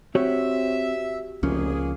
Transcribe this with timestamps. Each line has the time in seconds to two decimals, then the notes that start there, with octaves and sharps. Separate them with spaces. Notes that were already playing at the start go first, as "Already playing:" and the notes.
0.15 C4 F#4 G4 C#5 E5
1.43 F1 C#2 F3 A#3 C#4 G#4